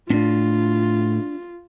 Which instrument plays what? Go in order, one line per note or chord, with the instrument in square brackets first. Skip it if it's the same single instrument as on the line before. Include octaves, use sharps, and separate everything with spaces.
[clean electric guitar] A2 [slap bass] C#4 D4 [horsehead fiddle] F4